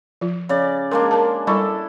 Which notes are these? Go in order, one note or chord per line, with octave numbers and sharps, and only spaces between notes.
F3 F4
C#3 D5
G#3 A#3 D4 A#4
A#4 A5
G3 E4 A4 C#6